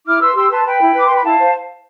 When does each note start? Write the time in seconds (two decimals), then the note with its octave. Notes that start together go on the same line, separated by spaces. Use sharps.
0.05 E4 D6 F6
0.20 B4 C6 E6
0.35 G4 C6 E6
0.50 B4 A5 C6
0.65 B4 G5 B5
0.80 E4
0.95 B4 D6
1.06 C6
1.10 B4
1.15 B5
1.24 E4 F5 A5
1.38 C5